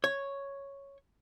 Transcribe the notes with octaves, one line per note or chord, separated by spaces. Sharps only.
C#5